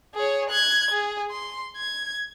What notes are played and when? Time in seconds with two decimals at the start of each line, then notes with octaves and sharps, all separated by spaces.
0.15 G#4 C#5
0.50 F#6 G#6
0.91 G#4
1.31 C6
1.77 G#6